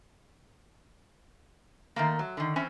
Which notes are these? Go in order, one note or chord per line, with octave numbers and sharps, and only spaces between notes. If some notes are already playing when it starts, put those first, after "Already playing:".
D#3 A3 A#3
F#3
D3 D#3
E3 C4 C#4